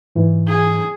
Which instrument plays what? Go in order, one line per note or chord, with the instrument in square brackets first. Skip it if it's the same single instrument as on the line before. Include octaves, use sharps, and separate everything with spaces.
[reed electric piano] G#2 E3
[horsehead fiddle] G#4